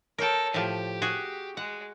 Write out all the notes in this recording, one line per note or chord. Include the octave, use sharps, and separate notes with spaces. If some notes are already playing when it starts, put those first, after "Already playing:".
A4 A#4 C#5 G5
A2 F3 G4
F#4 G#4
G#3 F#5